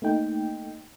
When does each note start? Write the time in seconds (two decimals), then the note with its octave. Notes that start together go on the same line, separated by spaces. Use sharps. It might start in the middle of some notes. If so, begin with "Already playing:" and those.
0.02 A3 A#3 D#4 G5